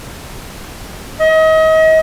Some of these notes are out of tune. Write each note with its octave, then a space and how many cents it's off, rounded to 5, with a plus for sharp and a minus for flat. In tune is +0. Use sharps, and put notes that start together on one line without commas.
D#5 +35